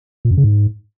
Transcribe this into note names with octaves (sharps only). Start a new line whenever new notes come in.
A#2
F#2
C#3
G#2